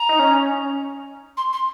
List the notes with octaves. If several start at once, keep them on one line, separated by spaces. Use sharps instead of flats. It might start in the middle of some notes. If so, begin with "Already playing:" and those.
Already playing: A#5
D#4
C#4
C6
C6